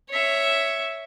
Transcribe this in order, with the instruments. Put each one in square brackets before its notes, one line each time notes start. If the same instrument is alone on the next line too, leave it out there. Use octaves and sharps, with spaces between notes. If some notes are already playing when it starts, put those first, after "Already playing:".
[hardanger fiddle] C#5 E5